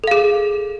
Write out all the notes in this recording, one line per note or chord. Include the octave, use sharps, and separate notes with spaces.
G#4 A4 F5